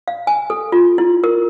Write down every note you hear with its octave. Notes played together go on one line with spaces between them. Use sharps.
F5
G#5
A4
F4
E4
A#4